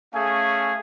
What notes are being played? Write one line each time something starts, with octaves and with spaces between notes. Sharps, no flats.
A3 C#4 G#4 F5 G#5